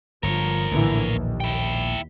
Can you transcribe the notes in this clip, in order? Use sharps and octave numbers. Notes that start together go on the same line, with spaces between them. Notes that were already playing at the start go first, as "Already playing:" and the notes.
G1 F3 A#4 C#5
A#1 A2 D3 E3
D#2
E4 G5